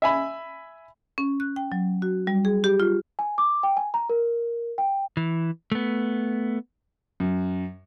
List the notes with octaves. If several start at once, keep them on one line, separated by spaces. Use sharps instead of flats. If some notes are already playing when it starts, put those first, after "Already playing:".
E5 G#5 B5
C#4
F#6
G5
F#3
F#4
G3
G#4
G4
F4
G#5
D6
G5
G#5
A#5
A#4
G5
E3
A3 B3
F#2